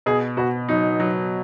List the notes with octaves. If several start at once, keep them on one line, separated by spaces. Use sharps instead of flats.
B2 G#4
B2 F#4
F#3 D#4
F#3